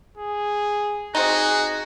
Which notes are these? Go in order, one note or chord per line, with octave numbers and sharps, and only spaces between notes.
G#4
C4 D#4 F#4 G#4